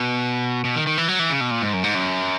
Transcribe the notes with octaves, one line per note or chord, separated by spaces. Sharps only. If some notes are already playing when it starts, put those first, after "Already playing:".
Already playing: B2
B2
D#3
D#3
E3
F#3
E3
C#3
B2
A#2
G#2
F#2
G#2
F#2